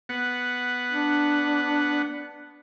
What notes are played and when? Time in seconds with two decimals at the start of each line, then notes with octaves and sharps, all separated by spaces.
0.09 B3 F#5
0.91 D4